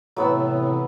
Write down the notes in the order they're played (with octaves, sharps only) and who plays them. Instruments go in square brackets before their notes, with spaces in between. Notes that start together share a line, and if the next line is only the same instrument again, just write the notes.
[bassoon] A2 [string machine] C3 E3 [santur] F#3 B3 E6